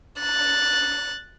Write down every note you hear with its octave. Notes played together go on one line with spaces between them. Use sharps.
F#6 A6